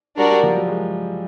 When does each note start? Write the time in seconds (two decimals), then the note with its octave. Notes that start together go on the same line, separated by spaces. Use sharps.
0.17 G3 D4 F#4 A#4 D5
0.30 G3
0.43 F3
0.55 F#3
0.68 G#3